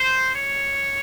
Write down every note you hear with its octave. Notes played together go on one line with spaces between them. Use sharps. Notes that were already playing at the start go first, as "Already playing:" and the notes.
Already playing: C5
C#5